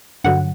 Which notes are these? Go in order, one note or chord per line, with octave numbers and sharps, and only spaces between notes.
G2 D3 F#3 F#5